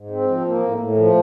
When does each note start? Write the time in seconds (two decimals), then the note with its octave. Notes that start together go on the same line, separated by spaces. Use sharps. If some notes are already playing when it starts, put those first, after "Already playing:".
Already playing: G#2
0.10 C4
0.28 F3
0.45 A#3
0.62 A2
0.80 A2
0.97 F3